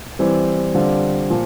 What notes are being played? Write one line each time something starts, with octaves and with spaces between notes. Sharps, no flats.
E3 G3 C4
D3 G3 C4 F4
A#2 F3